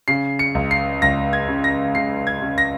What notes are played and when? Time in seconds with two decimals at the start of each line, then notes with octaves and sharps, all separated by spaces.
0.08 C#3 C7
0.39 C#7
0.55 C#2
0.71 C7
1.02 C#2 A#6
1.33 G#6
1.48 C#3
1.64 A#6
1.95 C#3 C7
2.27 G#6
2.42 C#3
2.58 A#6